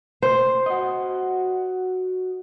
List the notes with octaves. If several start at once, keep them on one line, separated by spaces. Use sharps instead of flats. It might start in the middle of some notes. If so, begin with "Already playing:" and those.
C5
F#4 D#5